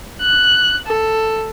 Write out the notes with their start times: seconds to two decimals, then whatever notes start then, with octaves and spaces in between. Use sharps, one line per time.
0.22 F#6
0.86 A4